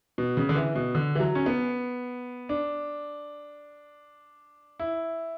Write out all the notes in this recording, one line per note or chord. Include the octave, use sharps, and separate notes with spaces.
B2
C#3
D3
E3
B2
D3
E3
F#3
C#4
B3
D4
E4